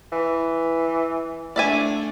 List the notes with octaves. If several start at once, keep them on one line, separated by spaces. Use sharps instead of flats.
E3
A3 D4 D5 E5 G#5